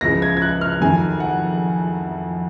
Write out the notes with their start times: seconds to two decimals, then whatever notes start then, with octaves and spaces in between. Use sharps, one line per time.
0.01 C#2 C#3 F3 A#6
0.22 G#6
0.37 G#6
0.42 F#6
0.61 F6
0.81 F2 D#3 F#3 G#5
1.20 F#5